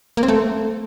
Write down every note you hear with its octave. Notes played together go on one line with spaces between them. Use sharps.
A#3
C4
A3